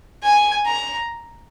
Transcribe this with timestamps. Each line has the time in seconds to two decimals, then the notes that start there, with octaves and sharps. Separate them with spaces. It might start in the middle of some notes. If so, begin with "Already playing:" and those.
0.23 G#5
0.66 A#5